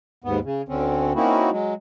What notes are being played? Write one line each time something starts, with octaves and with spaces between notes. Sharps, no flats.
D#2 G#2 B3
C#3
D2 D3 C4 C#4
A#3 C4 C#4 D#4 E4 F#4
F#3 G#3